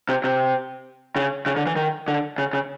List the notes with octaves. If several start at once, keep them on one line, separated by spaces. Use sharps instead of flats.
C3
C3
C#3
C#3
D3
E3
D#3
D3
C#3
C#3